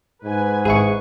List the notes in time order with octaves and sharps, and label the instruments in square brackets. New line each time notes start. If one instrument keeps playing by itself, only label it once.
[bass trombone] G#2 [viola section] B4 G#5
[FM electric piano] G#1 E4 C#6 [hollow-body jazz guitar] G#4